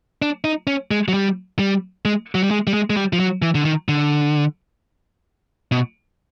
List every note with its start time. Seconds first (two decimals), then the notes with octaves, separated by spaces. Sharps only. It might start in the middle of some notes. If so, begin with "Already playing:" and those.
0.22 D4
0.44 D#4
0.67 C#4
0.91 G#3
1.08 F#3
1.14 G3
1.59 G3
2.05 G#3
2.35 F#3
2.43 G3
2.51 G#3
2.67 G3
2.74 G#3
2.90 G#3
2.97 G3
3.13 F3
3.20 F#3
3.42 E3
3.55 D3
3.65 D#3
3.89 D3
5.72 B2